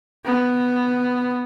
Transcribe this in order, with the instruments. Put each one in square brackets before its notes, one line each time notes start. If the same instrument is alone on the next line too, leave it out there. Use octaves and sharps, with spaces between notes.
[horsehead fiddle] B3